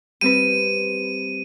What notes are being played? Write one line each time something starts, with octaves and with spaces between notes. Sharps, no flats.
G3 C4 B4 D#7